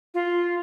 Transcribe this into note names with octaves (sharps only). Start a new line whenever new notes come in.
F4